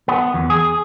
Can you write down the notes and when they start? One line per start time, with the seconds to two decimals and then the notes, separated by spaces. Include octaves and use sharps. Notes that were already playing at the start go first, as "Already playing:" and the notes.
0.08 B3
0.34 E2
0.50 G#4